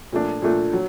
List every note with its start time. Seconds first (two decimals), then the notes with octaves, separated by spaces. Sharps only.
0.12 A#2 F3 A3 D4
0.42 A#2 F3 A3 D4
0.73 F#3